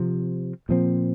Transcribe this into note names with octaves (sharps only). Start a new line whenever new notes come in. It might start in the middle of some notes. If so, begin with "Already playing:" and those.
Already playing: C3 F3 C4
A#2 F3 C4